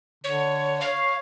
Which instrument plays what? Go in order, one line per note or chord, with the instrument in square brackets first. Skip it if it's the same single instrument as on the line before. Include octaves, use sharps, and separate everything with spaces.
[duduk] D3 [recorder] C#5
[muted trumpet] C#5 [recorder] F5